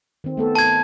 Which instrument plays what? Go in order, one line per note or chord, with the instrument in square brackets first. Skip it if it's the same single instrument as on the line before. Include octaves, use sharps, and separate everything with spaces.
[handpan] D#3 C4
A3 B3 A4
[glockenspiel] A5 G#6